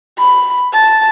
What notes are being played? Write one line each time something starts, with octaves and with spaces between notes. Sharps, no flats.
B5
A5